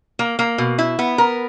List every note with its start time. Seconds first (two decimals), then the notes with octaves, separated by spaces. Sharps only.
0.19 A#3
0.39 A#3
0.58 B2
0.78 E4
0.99 B3
1.18 A#4